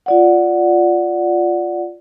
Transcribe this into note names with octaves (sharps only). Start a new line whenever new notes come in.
F4 D5 F#5